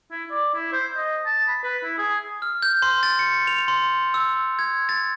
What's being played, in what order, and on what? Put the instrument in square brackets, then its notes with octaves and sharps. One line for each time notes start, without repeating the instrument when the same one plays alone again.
[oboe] E4
D5
E4
C5
D#5
A5
B5
B4
E4
G#4
[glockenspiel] F6
G6
C6
A6
C#7
F7
C6
E6
G#6
A6